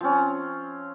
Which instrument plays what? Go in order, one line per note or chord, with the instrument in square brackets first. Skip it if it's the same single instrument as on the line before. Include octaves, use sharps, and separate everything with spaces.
[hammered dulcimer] F3 C4 C#4